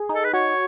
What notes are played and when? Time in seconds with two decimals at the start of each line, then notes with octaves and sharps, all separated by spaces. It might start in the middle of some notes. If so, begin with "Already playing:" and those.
Already playing: G#4
0.09 D#4
0.15 A4
0.24 B4
0.33 F#4 C#5